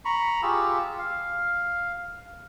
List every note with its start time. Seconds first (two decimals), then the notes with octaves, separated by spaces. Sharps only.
0.05 A#5 B5 C#6
0.43 F4 G4 G#4 E6
0.98 F5